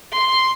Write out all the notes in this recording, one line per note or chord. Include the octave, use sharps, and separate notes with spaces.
C6